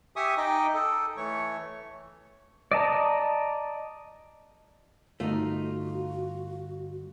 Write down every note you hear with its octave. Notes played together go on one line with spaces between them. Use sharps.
G4 E5 G#5 C#6 D#6
D#4 D#5 G5 D6
A4
E3 A3 C#5 C#6
D5 D#5 A5 A#5
G2 D3 A3 B3 D#4 F4 F#4